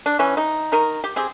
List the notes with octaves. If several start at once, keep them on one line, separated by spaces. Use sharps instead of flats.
D4
E3 C#4
D#4
D#3 D#4 A#4
G4
C4 G4 G#4